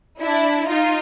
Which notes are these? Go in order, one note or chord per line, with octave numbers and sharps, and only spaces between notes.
D4 E4
D#4 F4